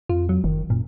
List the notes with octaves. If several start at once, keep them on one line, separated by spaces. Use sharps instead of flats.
F2 F4
F#3
F#1 D#3
F#2 A#2